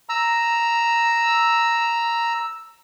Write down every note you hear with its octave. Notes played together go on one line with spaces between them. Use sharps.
A#5 E6